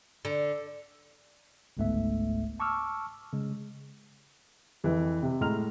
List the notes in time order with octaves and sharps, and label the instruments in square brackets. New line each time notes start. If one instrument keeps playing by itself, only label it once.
[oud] D3
[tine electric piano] G1 C#2 G#2 A3 B3 E5
A5 C#6 D6 E6 F6
C#3 G#3
[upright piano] F2 E3
C3
A2 G#3 A#5 F6 F7